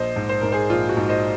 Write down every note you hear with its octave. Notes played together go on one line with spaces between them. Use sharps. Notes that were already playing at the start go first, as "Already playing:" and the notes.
Already playing: A#1 C5 D#5
G#2
C5
G#2 A#4
G#4 C5
A#1 F4
F#4
G#2
C5 D#5